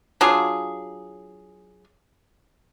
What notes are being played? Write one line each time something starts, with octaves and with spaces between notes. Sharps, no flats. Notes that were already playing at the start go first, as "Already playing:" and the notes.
F#3 D4 F4 G#4